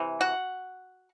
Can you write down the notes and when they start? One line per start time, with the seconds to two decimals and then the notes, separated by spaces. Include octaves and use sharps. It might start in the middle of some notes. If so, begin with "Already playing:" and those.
Already playing: C3 E3
0.21 F#4 F#5